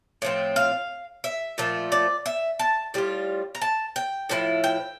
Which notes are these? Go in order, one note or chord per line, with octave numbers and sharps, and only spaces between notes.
A2 F3 C4
F5
E5
A#2 F3 A3
D5
E5
A5
A2 G3 F4
A#5
A5
G5
A2 F3 C4 E4
G5